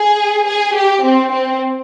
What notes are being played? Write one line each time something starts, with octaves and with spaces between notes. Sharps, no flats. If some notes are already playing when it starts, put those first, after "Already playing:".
Already playing: G#4
G#4
G4
C4
C4